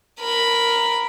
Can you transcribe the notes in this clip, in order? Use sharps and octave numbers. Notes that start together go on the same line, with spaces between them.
A#4 B5